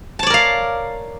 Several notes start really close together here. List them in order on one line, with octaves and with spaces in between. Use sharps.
A5 C#5 D5 A#4 F5